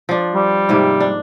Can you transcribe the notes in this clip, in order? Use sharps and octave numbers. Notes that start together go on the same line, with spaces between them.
F3 D4
G3
G#2 C3 A#3
D4